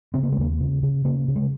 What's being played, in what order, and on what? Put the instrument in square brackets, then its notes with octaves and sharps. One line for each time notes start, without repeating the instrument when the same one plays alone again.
[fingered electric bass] C#3 C4
A#3
G#3
D#2 A#3
C#3
C#3
C#3 A#3
C#3
G#3